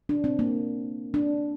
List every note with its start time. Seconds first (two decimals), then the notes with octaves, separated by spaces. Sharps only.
0.09 D4
0.24 C4
0.39 A#3
1.14 D4